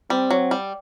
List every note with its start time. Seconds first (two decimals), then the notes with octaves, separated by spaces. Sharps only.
0.10 G3 C4
0.31 F#3
0.51 G3